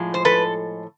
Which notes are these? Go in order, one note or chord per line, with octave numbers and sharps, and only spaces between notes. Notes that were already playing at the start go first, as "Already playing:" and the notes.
Already playing: A2 F3 G#3
C5
A4 B4